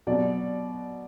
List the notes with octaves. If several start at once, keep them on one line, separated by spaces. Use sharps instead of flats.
B2 F#3 D5